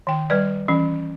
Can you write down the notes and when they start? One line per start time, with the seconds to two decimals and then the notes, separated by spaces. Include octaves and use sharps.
0.07 D#3 G5
0.30 G3 B4 D5
0.68 E3 C#4